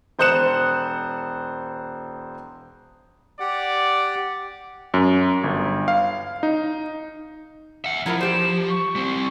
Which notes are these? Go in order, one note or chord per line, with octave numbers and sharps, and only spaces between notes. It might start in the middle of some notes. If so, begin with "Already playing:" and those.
E1 C5 D#6 F#6 C#7 E7
G4 D5 F#5
F#2
G1
F5
D#4
E5 F#5 C#7
F3 E4 F4 A#4 A#5
F4 G4 C5 E7
C#6
G3 C4